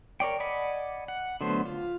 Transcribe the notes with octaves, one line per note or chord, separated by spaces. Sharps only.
A#4 C#5 D5 G5
D5 D#5 F#5 G#5 B5
F#5
D3 F#3 A3 B3 C5
F4